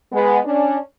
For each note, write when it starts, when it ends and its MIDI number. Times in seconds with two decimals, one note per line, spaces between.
0.12 0.38 56
0.12 0.38 59
0.45 0.78 61
0.45 0.78 62